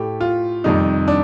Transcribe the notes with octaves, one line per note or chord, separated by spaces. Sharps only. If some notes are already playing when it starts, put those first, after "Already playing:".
Already playing: A2 A3 G4
F4
F2 C3 D#3 G3 D#4
D4